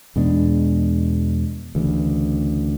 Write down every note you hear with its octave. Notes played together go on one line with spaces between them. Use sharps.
E2 B2 G#3 D4
D2 C#3 E3